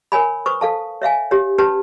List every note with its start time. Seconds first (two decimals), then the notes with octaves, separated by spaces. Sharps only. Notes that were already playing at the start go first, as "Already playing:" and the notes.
0.12 A#4 C#5 G#5 B5
0.46 B4 C5 C#6 D#6
0.61 A4 F5 A5
1.02 C#5 E5 F5 G#5
1.31 G4 C#5
1.58 C#4 G4 B4 A5